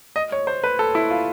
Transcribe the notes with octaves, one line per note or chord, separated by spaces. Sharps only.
D#5
C#5
C5
B4
A4
E4
F4